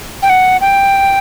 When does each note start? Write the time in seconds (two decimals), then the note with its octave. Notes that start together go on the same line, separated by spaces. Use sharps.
0.23 G5
0.29 F#5
0.61 G5